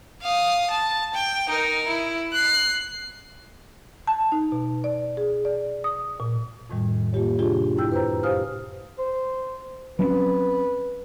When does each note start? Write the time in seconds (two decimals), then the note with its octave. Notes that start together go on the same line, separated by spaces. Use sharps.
0.21 F5 D#6
0.70 A5
1.14 G5
1.49 D#4 A#4
1.88 E4
2.32 F#6 C7
4.07 A5
4.32 D#4
4.52 B2
4.84 D5
5.17 G#4
5.45 D5
5.84 D#6
6.20 A#2
6.70 F2 A2 D#3 G3
7.13 A#3 F4 G4 C#5
7.39 C3 D4 F4 G4 G#4
7.77 F#2 E4 G5 E6 G6
7.92 B4 C5 A#5
8.23 G4 C5 F5 G#5 D#6 F6
8.98 C5
9.99 F#3 C4 C#4 B4